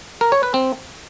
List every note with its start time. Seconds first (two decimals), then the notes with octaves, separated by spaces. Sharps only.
0.21 A#4
0.32 C#5
0.43 B4
0.54 C4